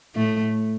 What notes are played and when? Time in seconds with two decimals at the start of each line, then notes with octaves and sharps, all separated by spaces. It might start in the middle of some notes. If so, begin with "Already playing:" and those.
0.15 A2 A3